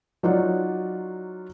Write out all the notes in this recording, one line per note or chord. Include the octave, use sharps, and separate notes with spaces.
F#3 D#4 F4 C#5 D5 F#5